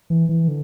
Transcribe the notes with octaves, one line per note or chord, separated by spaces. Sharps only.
E3
E3
D3